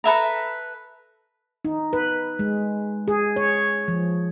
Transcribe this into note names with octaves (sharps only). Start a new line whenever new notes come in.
A4 B4 E5 A#5
D#4
B4
G#3
G#4
C#5
F3